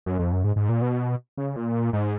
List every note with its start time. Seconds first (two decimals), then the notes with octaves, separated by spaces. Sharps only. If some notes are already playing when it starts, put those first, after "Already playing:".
0.06 F#2
0.19 F2
0.32 F#2
0.44 G#2
0.56 G#2
0.69 A#2
0.82 B2
1.37 C#3
1.56 A#2
1.93 G#2